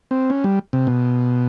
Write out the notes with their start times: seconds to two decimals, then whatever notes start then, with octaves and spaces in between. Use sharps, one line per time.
0.11 C4
0.30 C#4
0.44 G3
0.73 C3
0.87 B2